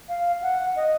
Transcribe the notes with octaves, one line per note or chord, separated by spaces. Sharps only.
F5
F#5
D#5